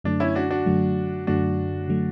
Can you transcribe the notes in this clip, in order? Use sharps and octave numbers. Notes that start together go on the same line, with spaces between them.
F#2 D3 F#3 A3 D4
C#4 E4
D4 F#4
D4 F#4
F#2 D3 F#3 A3
F#2 D3 F#3 A3 D4 F#4
D3 F#3 A3